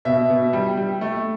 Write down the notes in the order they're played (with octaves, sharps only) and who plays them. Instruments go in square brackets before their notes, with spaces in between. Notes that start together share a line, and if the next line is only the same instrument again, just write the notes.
[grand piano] B2 [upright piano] E5
[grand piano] B2
G3
G3
A3